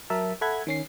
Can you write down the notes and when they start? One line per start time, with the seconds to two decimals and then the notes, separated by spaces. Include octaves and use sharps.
0.10 F#3 A#4 E5 A5
0.41 A4 E5 F#5 B5 G#6
0.67 D#3 C#4 C7